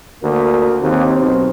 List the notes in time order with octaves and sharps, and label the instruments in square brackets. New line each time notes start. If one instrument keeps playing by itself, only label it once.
[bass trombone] D2 [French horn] A#3
[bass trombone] D#2 [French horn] C4
[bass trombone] B1